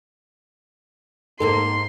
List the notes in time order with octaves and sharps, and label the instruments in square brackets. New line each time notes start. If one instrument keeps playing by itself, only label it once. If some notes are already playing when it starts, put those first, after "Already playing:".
[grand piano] G#2 [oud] A#3 C4 A4 [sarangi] C6